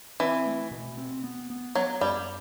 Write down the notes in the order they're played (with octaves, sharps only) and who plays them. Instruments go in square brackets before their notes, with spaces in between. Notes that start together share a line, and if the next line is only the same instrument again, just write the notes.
[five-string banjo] E3 [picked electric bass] C4
[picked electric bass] A3
B2
C4
B3
B3
[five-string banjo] F#3 [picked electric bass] B3
[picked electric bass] F#2 [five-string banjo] G3